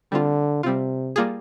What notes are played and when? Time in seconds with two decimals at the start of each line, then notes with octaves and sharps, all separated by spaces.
0.12 D3 G3 C4 F4
0.63 C3 G3 C4 F4
1.16 G3 A#3 F4 G#4